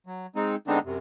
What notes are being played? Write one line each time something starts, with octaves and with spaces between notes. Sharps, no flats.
F#3
G#3 C4 D#4
D3 G#3 B3 C4 D4 D#4
F#2 C3